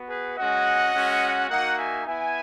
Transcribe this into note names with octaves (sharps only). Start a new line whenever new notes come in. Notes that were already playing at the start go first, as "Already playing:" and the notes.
Already playing: B3 F#4
G#4 B4
G#3 C#4 F#4 D#5 F#5
G#3 C#4 F#4
A#3 D#4 F#4 D#5 F#5
E5 G#5
B3 E4 E5 G#5